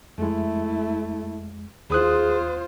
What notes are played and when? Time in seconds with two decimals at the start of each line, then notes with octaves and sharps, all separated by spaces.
0.18 F2 G#3 A3 E4
1.90 D#2 F4 G#4 C5 D#6 F#6